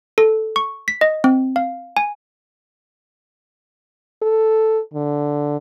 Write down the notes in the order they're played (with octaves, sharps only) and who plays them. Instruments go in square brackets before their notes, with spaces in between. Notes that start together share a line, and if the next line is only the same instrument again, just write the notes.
[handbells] A4
C#6
B6
D#5
C4
F5
G#5
[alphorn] A4
D3